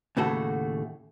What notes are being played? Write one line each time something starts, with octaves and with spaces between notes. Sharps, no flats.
D#2 A2 C#3 A3 F#4 A4